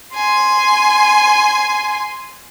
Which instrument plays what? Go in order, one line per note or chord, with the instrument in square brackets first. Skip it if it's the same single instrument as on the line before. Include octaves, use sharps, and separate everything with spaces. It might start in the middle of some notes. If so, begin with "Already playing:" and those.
[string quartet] G#5 C6